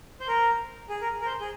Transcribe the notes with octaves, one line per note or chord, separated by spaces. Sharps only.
C5
A#4
G#4
A#4
A#4
C5
G#4